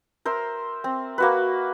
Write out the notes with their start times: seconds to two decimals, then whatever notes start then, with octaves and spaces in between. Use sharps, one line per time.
0.25 A#4 C5 E5
0.84 C4
1.18 A#3 F#4 B4